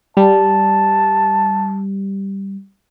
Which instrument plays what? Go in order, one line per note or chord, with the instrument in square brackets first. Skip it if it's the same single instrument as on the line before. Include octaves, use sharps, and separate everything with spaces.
[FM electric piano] G3 [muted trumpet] A5